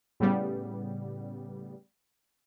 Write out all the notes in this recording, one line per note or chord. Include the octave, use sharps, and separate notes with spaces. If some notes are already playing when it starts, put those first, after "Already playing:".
A2 C#3 G3 B3